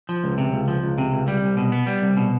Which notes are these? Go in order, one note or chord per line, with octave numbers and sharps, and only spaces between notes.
F3
C#2
C3
C#2
F3
C#2
C3
C#2
G3
C2
B2
B3
G3
C2
B2